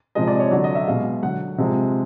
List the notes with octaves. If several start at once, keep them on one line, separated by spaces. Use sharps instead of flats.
C3 F3 G#3 D#5
D5
C#5
D3 F#3 D5
D#5
E5
B2 G#3 F5
D3 F#3 F#5
C3 F3 G#3